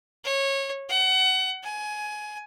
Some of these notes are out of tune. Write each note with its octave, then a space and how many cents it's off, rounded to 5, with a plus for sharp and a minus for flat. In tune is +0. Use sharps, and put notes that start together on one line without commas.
C#5 -20
F#5 +25
G#5 +20